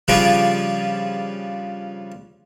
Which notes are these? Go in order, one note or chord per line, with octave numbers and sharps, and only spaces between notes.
C#3 F3 G3 D4 F4 G#4